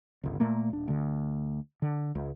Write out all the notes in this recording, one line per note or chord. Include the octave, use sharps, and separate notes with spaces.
G1 C#2
A#2 A3 A#3
D#1 D4
D2 D3
D3
C#2